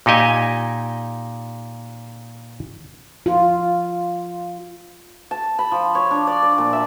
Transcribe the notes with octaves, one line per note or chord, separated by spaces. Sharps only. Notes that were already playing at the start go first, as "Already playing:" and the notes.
A#2 D#4 G4 D#5 G#5
F4
A5
B5
F3
C#5
D4
D5
D5
A#2
E5